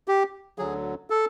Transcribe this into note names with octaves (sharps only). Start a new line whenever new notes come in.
G4
D2 D3 F#3 G#4
A4